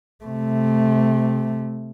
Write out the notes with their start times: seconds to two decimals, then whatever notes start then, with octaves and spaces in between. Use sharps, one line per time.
0.25 C3 A3